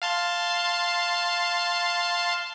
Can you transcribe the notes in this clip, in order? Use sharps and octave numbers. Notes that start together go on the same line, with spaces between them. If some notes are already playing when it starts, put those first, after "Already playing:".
F5 A5 C6